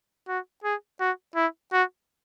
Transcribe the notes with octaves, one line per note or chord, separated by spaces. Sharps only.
F#4
G#4
F#4
E4
F#4